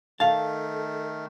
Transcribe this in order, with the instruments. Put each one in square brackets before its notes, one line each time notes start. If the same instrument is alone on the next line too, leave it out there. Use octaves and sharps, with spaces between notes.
[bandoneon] D#3 A3 [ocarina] A4 [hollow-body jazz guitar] F5 A5